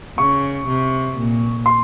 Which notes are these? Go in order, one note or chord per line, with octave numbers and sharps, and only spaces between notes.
C#3 C#6
C3
A#2
C6